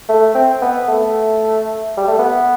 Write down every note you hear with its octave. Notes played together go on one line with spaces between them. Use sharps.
A3
C4
B3
A3
G3
A3
B3